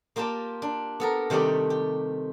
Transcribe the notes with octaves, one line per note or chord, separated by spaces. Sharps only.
A#3 F4 G4 D5 A5
D4
B3 A4 A#4
C3 D#3 G3 A3 G4 D5
G4